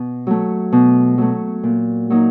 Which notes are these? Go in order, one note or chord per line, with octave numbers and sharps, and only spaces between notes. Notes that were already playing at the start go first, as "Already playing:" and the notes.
Already playing: B2
F#3 A3
B2
F#3 A3
A#2
F#3 A#3 D#4